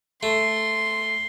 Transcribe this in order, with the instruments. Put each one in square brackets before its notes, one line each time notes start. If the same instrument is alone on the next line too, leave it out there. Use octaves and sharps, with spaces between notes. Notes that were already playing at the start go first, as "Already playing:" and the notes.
[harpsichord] A3 [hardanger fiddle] C6